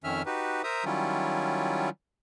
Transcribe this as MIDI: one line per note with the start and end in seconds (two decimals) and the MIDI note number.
0.04 0.22 41
0.04 0.22 51
0.04 0.22 61
0.04 0.22 76
0.04 0.22 89
0.26 0.62 63
0.26 0.62 66
0.26 0.62 67
0.26 0.62 71
0.64 0.85 70
0.64 0.85 72
0.64 0.85 76
0.64 0.85 82
0.64 0.85 87
0.85 1.89 51
0.85 1.89 54
0.85 1.89 55
0.85 1.89 61
0.85 1.89 64
0.85 1.89 65